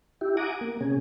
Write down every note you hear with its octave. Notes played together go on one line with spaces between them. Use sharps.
E4 G4
F#5 G#5 A#5 D6 D#6
A#3
C3 C#4 G#4